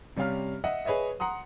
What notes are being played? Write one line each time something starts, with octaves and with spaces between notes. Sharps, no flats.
C3 G3 C#4 F5 F6
D#5 E5 F#5
G#4 B4 C#5 D#5 E5
F#5 A#5 C6 D#6